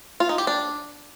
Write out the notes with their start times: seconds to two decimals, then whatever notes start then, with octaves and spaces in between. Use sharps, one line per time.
0.20 F4
0.29 D#4
0.38 G4
0.47 D4